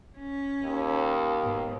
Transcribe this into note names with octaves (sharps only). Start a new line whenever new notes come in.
C#4
D#2
G#2 B2